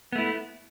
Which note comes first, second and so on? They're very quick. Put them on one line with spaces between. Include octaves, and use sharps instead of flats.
B3 A3 E4